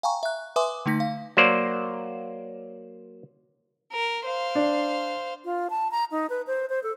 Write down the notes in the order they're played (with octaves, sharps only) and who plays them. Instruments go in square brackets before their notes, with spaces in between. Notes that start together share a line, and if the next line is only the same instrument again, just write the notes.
[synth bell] F5 G5 G#5 A#5 C#6
E5 F#6
B4 E5 G#5 C6 D6 D#6
D3 A3 D#4 A#6 B6
F5
[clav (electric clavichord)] F#3 A#3 C5 D5
[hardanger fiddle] A#4
C5 F5
[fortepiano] D4
[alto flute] F4
A5
A#5
D#4
B4
C5
C5
A4